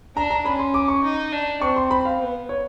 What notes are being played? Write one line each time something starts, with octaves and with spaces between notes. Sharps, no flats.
D4 A#5
A#5
C#4 B5
C6
D6
C#6
D#4
D4
C4 C#6
C6
B5
F5
B3
C#5